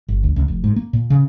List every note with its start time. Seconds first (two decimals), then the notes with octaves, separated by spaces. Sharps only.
0.08 G1
0.23 D2
0.36 C#2
0.48 F1
0.64 G#2
0.76 A#3
0.93 A#2
1.10 C#3